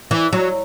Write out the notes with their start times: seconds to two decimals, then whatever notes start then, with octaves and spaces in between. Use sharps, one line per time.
0.11 E3
0.33 F#3